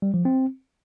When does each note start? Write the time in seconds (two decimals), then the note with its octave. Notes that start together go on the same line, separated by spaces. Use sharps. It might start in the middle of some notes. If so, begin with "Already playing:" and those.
0.02 G3
0.14 F3
0.25 C4